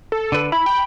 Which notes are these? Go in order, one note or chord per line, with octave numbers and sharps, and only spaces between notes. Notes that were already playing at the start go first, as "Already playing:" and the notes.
A4
D3 B4
E4 B5
G5